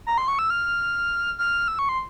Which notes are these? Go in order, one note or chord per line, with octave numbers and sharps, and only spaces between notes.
A#5
C6
C#6
E6
F6
F6
E6
C#6
C6